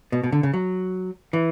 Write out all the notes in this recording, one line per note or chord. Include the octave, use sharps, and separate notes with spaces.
B2
B2
D3
C#3
F#3
E3